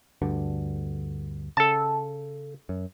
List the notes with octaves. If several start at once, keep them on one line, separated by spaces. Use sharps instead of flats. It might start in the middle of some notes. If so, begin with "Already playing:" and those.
D2 G2 D3
C#3 A4 A5
F#2